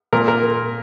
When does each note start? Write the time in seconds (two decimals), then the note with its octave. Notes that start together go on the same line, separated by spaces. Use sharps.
0.13 A#2 A#4
0.28 A#4